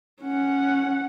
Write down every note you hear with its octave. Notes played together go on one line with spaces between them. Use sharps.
C#4 F#5